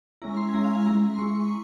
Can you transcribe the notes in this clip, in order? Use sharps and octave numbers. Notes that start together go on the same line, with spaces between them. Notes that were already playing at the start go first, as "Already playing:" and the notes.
G#3 C#4 E4 A#5
C6
G#5
G#3 C#4 E4 A#5
F5
G#5
G#3 E4 A#5
C6
G#3 E4 C#6
C#6